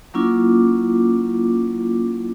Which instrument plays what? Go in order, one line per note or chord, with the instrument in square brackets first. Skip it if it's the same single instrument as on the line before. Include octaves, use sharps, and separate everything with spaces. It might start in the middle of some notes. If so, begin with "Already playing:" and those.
[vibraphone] F#3 A#3 C#4 E4 F4 D6